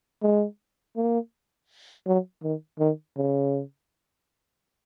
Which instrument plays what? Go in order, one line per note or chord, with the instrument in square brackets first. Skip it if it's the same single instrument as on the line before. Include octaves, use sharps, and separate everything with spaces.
[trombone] G#3
A#3
F#3
D#3
D#3
C#3